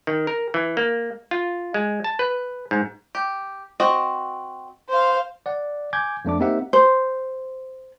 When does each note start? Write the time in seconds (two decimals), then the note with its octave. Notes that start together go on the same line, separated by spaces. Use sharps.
0.07 D#3
0.27 A#4
0.54 E3
0.77 A#3
1.31 F4
1.74 G#3
2.04 A5
2.19 B4
2.71 G#2
3.15 G4
3.80 C4 F#4 D#5
4.89 C5 F5
5.46 D5 F#5
5.93 G#5 D6 G6 G#6
6.25 F2 A3 D4 D6
6.40 A#3 C4 D#4 G4 E5 F#5
6.73 C5